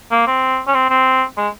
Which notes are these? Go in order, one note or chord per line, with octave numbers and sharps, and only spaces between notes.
A#3
C4
C#4
C4
C4
G#3